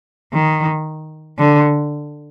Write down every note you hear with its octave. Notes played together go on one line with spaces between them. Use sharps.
D#3
D3